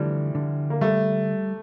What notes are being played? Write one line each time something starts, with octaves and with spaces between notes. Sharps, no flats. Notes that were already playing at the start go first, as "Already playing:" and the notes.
Already playing: D3 E3 F3 G3 A3
D3
A#3
G3 A3